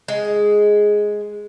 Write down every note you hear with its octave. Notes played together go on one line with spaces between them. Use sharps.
G#3